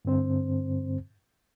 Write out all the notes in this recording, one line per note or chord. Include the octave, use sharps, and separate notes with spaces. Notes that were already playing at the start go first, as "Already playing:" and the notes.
G2 D3 C4 C5